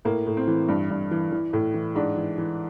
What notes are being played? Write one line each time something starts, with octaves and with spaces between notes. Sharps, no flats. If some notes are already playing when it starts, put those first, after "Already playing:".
A2 A#3
A2
C4
E3
G2
G2
E3
E3
A2
E3
G#2 D4
E3
E3